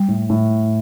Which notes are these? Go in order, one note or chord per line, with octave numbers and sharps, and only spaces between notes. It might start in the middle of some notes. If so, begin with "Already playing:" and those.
Already playing: G3
A2
A2